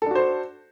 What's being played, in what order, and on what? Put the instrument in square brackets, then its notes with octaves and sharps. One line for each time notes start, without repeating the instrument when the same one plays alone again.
[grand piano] A4
D4
F#4
C5